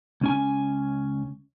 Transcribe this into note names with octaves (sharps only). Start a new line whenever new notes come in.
C#2 C#4 G#5